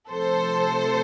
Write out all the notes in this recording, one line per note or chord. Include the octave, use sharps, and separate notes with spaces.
C3 F3 A3 A4 C5